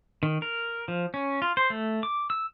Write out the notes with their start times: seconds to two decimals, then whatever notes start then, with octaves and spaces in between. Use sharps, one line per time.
0.23 D#3
0.42 A#4
0.88 F3
1.14 C#4
1.42 F4
1.57 C5
1.70 A3
2.03 D6
2.30 E6